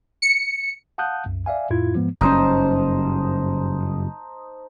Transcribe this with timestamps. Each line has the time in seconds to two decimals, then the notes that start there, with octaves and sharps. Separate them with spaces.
0.22 C#7
0.98 F5 F#5 A5 D#6 F#6 G6
1.26 C2 F#2
1.46 D5 E5 F5 G#5
1.70 F2 A2 E4 F4 G#6
1.94 G#2 F3 G#3 B3
2.21 F#1 G2 C#4 D#4 C5 A5